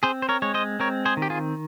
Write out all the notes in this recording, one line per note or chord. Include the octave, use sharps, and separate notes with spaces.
C4 G#4 C5
C5
A#4 C#5
G#3 C#5
C5 D#5
C4 A#4 C#5
G#4 C5
D#3
G4
F4 G#4